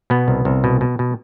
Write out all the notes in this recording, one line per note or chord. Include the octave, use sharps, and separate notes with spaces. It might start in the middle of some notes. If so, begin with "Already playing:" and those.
B2 B3
C2
C2
B2
B2
B2